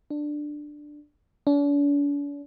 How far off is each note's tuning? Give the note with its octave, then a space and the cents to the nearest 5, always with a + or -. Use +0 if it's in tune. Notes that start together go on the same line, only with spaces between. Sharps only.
D4 +10
D4 -45